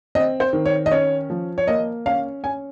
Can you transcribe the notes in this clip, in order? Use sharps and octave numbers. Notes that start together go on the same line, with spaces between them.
C4 D#5
C5
D#3
C#5
D#5
C#4 C#5
F3
C#5
A#3 D#5
C#4 F5
C#4 G#5